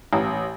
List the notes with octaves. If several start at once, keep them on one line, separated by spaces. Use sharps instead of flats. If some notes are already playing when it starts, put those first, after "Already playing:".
A1